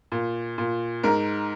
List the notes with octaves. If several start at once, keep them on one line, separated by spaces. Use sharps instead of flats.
A#2
A#2
G#2 A#4